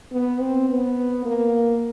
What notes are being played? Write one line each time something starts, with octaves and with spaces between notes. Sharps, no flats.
B3
C4
B3
A#3